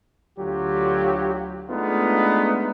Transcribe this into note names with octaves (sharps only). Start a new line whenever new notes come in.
D2 D3 F#3 F4 G4
G#3 A3 B3 D4 D#4 F4